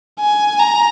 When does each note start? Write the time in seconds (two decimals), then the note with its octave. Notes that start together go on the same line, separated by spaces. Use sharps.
0.20 G#5
0.60 A#5